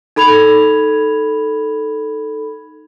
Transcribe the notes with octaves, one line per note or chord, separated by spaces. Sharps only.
D#4 A4 B5 G#6 F7